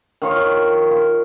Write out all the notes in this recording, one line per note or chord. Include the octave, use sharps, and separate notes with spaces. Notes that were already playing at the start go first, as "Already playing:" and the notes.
D#3 F4 C#5
F4